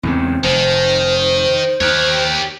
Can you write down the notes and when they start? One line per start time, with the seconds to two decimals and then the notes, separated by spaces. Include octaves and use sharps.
0.03 E2 G#2 C#3 C4
0.44 F1 D#3 C5
1.81 D#2 G4 C#5